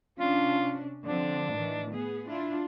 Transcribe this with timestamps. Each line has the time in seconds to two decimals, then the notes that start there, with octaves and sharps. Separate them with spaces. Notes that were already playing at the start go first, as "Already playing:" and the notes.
0.20 C3 C#4 D4 F4
1.05 D3 F3 C4 D4
1.54 A2 D#3 E3
1.93 B3 G#4
2.27 D4 E4 F4